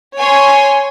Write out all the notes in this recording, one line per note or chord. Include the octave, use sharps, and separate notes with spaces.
C#5 G#5 C6